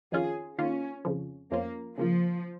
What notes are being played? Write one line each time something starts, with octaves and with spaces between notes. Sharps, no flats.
F2 D#3 C#4 F4 G#4
D#3 A#3 C#4 F4
F2 C#3 F3
F2 F3 A#3 C#4 F4
C#3 F3 A#3 F4